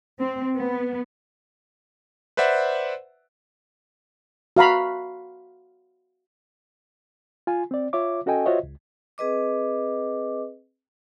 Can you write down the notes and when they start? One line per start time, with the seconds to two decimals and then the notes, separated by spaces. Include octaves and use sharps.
0.19 C4
0.58 B3
2.37 B4 C5 D5 E5 F#5
4.56 F#4 F5 A#5 B5
7.47 F4 G#5
7.71 C4 D5
7.93 F4 C#5 E5 D6
8.26 C#4 F#4 A4 D#5 G5 G#5
8.46 F4 F#4 C5 C#5 D#5 E5
8.63 C#2
9.18 C4 G#4 B4 D#5 D6